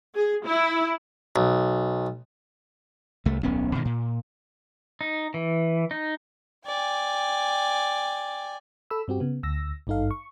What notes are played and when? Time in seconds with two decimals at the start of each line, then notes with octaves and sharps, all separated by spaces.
0.16 G#4
0.45 E4
1.36 B1
3.25 C2 A3
3.43 D1 B1 B3 C#4
3.73 G2 B2 D#3
3.85 A#2
5.01 D#4
5.34 E3
5.91 D#4
6.68 D5 G5 G#5
8.90 A4 B5 E6
9.08 G2 C4 F#4 G4
9.20 C#3 B3
9.43 D2 E6 A#6
9.87 G#1 G2 D#4 A4 F5
10.11 C#6